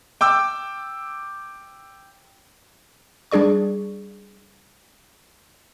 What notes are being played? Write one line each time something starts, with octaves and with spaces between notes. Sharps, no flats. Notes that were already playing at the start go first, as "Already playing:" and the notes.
G5 D6 E6
G3 D4 G#4 D5 C#6